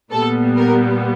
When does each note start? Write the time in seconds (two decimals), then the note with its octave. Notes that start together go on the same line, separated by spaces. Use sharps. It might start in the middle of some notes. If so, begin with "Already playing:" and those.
0.12 A#2 G3 B3 A4
0.57 A#4